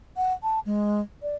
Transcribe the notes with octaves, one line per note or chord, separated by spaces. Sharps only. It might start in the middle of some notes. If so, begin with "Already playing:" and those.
F#5
A5
G#3
D5